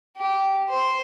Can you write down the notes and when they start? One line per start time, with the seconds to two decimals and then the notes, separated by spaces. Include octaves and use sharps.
0.17 G4
0.69 C5